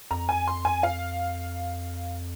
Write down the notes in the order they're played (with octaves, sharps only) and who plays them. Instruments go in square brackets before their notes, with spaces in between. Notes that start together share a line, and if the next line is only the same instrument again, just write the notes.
[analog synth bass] F2 [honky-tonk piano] A#5
[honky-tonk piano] G#5
C6
G#5
F5